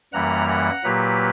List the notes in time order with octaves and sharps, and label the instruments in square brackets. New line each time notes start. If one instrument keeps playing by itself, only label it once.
[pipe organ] F#2 E3 G3 A#3 F#5 A#5
F#5 A#5
A#2 F#3 A#3 G4 B4